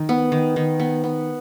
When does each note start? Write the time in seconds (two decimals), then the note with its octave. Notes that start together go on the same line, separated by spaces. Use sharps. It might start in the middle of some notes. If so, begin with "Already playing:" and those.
Already playing: D#3
0.09 B3
0.32 D#3
0.56 D#3
0.80 B3
1.04 B3